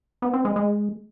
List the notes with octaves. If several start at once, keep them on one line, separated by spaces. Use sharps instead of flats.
B3
C4
G#3
G#3